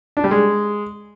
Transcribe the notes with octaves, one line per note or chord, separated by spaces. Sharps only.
D4
G3
G#3